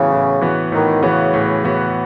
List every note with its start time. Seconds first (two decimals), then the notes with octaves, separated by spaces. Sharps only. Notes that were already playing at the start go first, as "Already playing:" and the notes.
Already playing: A2 C#3 E3 B3 F#4
0.11 A2
0.41 E3 B3 F#4
0.72 A2 D#3
1.03 C#3 E3 B3 F#4
1.34 A2
1.64 E3 B3 F#4